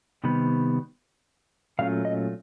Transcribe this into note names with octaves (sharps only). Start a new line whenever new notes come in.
C3 D#3 G3 B3
A#2 F#3 A3 C#4 F4 F5
D#5